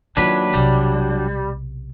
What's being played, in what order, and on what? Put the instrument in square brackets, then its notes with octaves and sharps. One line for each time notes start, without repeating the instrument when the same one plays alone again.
[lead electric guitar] D#2 B4 [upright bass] D#3 F4 [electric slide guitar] F#3 D4
[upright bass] B1 C3 [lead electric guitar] G3